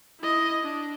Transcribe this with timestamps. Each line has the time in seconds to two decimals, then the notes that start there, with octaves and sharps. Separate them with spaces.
0.20 E4 D#5
0.63 D4